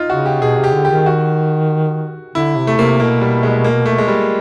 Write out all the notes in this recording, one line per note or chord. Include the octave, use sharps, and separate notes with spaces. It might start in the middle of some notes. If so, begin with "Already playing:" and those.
Already playing: D#4 F4
C#3 F#4
G4
B2 G#4
C3
G4
D3
G4
D#3
F#4
D3 E4
C3
A3
C3 A#3
B2 A#3
G3
G#3
A#3
A3
G#3
G3